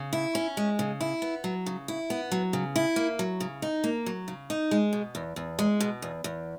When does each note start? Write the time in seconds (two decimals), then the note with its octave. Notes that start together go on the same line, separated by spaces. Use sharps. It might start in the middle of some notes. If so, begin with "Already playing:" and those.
Already playing: C#3
0.13 E4
0.35 C#4
0.57 G#3
0.79 C#3
1.01 E4
1.22 B3
1.44 F#3
1.66 C#3
1.88 E4
2.10 B3
2.32 F#3
2.53 C#3
2.76 E4
2.96 A#3
3.19 F#3
3.40 C#3
3.62 D#4
3.84 A#3
4.06 F#3
4.28 C#3
4.50 D#4
4.71 G#3
4.93 B2
5.15 E2
5.36 E2
5.59 G#3
5.80 B2
6.02 E2
6.24 E2